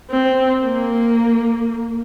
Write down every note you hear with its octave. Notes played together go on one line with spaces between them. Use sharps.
C4
A#3